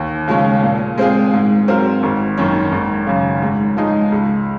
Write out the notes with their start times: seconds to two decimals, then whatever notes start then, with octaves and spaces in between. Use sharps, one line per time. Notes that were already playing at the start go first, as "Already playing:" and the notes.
Already playing: D#2
0.28 C#3 F3 G#3 C#4
0.63 A#2
0.98 G#3 C4 F4 G#4
1.33 G#2
1.68 F#3 C4 F4 A#4
2.03 G#1
2.37 F#2 D#3 A#3 C#4
2.72 G#1
3.07 F#2 C#3
3.42 G#2
3.77 F3 G#3 D#4
4.12 C#2